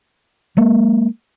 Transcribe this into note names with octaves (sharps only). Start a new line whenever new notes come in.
F#3 G#3 A#3